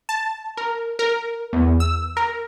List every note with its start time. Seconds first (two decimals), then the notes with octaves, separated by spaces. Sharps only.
0.09 A5
0.57 A#4
0.99 A#4
1.53 E2
1.80 E6
2.17 A#4